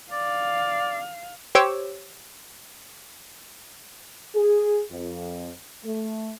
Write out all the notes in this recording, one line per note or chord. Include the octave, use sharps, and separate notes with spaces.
D5 F5
G4 C5 C#5 D6 E6
G#4
F2
A3